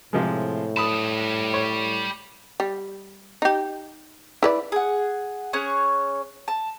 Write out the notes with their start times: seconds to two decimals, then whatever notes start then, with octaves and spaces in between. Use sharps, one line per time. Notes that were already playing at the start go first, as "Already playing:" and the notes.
0.13 A2 C3 F3 G#3
0.77 G3 A5 B5 D#6
1.54 C#5
2.60 G3
3.42 D#4 G4
4.43 E4 B4 D5
4.72 G#4 F#5
5.53 C#4 G#4 C#5 F#6
6.48 A5